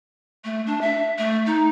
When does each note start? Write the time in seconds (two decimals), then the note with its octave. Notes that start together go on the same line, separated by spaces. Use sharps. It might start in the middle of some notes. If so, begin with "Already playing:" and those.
0.44 A3
0.66 D4
0.81 E5
1.18 A3
1.46 D#4